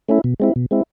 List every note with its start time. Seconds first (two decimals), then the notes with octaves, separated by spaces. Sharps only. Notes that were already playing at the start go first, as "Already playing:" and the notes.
0.09 A3 C#4 E4
0.24 B2
0.40 G#3 C4 E4
0.56 B2
0.71 G#3 C4 E4